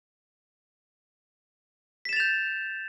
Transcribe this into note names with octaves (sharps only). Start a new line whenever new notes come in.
G6 A6 B6 E7 F7